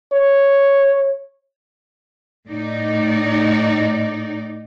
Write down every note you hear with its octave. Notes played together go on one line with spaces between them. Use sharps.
C#5
A2 D#4 D5